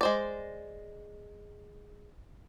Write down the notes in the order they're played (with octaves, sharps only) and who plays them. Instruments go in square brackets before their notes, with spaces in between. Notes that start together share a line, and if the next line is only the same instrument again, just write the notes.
[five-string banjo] G#3 C5 D5